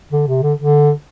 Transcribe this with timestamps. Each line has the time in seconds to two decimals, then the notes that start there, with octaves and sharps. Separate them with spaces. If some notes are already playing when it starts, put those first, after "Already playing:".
0.12 D3
0.28 C3
0.42 D3
0.59 D3